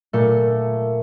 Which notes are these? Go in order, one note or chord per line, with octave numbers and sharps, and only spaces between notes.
A#2 A3